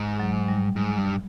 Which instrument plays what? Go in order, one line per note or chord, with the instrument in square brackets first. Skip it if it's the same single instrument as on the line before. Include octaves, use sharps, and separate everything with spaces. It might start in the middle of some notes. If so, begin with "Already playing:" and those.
Already playing: [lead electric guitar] G#2
[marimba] F#3
G3
[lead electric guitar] G#2
G2